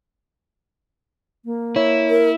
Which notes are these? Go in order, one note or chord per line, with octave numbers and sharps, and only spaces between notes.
A#3
E4 C#5
A#4